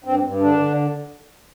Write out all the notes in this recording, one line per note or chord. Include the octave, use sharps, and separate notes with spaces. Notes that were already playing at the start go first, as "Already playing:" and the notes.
G2 C4
G2
D3 D4
D3